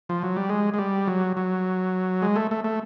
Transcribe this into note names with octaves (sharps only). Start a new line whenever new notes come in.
F3
F#3
G3
G#3
G#3
G3
F#3
F#3
G#3
A3
A3
A3